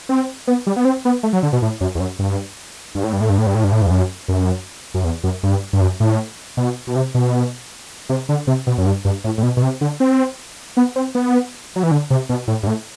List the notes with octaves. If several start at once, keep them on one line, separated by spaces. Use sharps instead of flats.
C4
B3
G3
B3
C4
B3
A3
F#3
D3
B2
A2
F#2
E2
F#2
G2
G2
A2
G2
A2
G2
A2
G2
A2
G2
A2
G2
E2
F#2
F#2
F#2
E2
F#2
G2
G2
F#2
A2
B2
B2
C3
B2
C3
D3
C3
B2
F#2
G2
G2
A2
A2
B2
B2
C3
D3
C4
B3
C4
B3
F#3
E3
D3
C3
B2
A2
G2
A2